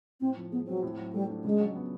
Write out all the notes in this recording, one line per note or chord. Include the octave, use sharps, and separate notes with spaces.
A2 C4
F3
G#3 B3
F#3 C4
A2
F#3
G3 A3
D4
C#3 G#3
F#3
B3